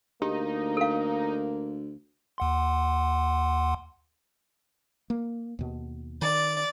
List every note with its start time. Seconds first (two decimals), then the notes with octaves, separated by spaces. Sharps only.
0.22 D2 A#3 D#4 G4
0.77 A4 F5
2.38 D#2 F#5 C6
5.10 A#3
5.59 D#2 B2
6.22 D#3 D5